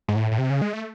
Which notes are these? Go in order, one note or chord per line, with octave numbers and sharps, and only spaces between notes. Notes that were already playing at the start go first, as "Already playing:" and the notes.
G#2
A2
A2
C3
C#3
G#3
A3